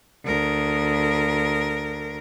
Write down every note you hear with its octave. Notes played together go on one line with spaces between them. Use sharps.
D2 A#4